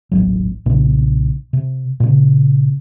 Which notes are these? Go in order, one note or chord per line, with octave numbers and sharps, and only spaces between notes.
D#1 A1 F2 F#3
B1 A#2 C#3 D4
C3
A#2 C#3